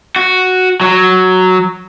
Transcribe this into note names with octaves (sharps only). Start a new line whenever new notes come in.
F#4
F#3